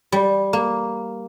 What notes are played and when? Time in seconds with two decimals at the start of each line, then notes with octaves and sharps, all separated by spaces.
0.12 G3
0.53 A#3